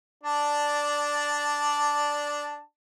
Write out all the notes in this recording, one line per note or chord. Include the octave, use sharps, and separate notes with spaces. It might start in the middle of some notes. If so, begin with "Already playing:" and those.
D4 D5 A5